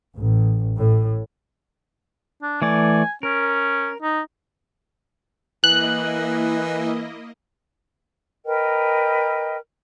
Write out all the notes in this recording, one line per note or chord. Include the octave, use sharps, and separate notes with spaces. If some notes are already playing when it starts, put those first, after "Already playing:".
A1
A2
D4
E3 A3 D5 G#5
C#4 A#4
D#4
E3 A#3 E4 D#5 F#6
A#4 B4 D#5 G5